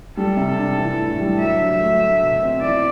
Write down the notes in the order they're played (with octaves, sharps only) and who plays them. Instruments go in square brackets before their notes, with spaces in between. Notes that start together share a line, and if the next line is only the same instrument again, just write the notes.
[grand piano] G3 [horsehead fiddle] A4
[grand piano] C3
D4
E3
A2
G3
[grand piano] F#3 [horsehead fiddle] E5
[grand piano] D3
A3
A3
B2
C4
[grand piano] E3 [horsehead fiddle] D5